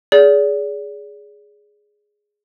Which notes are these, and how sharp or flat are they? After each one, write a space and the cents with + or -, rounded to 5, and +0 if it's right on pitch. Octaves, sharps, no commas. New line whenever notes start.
G#4 +0 D5 -35